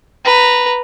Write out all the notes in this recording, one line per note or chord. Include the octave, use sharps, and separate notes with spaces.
B4 A#5